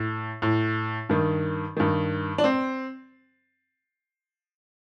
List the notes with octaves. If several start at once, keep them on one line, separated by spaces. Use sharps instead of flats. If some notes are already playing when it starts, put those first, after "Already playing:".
Already playing: A2
A2
G2 D#3
G2 D#3
D4
C4